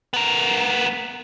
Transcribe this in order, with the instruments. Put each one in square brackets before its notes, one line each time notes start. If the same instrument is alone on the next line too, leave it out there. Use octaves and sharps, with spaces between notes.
[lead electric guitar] B3 A#4